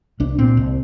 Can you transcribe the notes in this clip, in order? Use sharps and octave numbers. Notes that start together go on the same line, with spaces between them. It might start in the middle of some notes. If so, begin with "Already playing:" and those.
C2 D4
A#2 C4
C2